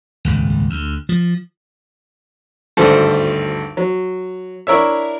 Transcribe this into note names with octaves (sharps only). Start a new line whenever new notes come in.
D#1 G#1 C#2
D2
F3
G#1 D2 G2 A4 C5
F#3
D4 E4 A#4 C#5 E5